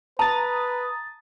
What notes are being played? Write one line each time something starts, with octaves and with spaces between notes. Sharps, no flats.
B4 A5 A#5 D#6 A6